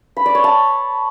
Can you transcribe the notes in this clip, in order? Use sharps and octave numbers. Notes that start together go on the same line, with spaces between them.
B5
D5
C#5
A5